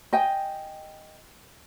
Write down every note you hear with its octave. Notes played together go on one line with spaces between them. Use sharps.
D#5 G5 G#5